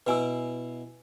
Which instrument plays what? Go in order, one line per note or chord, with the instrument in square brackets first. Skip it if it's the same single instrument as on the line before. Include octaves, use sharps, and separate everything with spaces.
[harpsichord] B2 E4 [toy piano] B4 G#5 E6